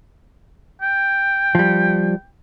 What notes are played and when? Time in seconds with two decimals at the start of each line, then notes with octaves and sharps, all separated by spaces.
0.82 G5
1.55 F3 G3